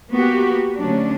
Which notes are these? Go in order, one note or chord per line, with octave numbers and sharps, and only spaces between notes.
A#3 B3 F#4 G4
D2 F#3 C#4 D4